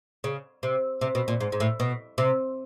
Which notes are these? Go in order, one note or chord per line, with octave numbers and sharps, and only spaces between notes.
C#3
C3
C3
B2
A#2
G#2
G#2
A2
B2
C3